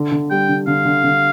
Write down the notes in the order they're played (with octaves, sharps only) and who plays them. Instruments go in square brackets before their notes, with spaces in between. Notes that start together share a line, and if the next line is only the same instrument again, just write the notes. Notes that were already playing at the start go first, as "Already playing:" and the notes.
Already playing: [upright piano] D3
D3
[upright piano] G3 [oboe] G5
[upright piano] D3
[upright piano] D3 [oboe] F5
[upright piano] D3
D3